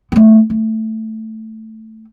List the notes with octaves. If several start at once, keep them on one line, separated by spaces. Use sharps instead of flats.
A3 B3
A3